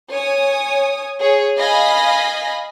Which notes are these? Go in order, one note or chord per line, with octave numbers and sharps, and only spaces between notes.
C#5 G#5 D#6
G#4 C#5
D#5 F5 G#5 B5 A#6